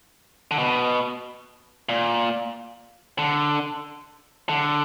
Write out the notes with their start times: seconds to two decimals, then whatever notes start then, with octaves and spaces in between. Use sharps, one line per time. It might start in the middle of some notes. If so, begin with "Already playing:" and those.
0.51 D3
0.59 B2
1.89 A#2
3.19 D3
4.49 D3